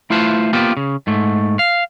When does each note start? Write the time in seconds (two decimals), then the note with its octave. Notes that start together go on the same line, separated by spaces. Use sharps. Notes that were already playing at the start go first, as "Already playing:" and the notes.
0.10 A3 E4 F4 B4 C5 A5
0.53 A#3 B3 F4 G4 C5
0.77 C#3
1.07 G#2 A3
1.59 F5